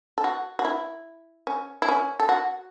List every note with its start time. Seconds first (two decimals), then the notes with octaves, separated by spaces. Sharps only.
0.18 A4
0.24 F#4
0.59 F#4
0.65 E4
1.47 C#4
1.82 E4
1.88 C#4
2.20 A4
2.29 F#4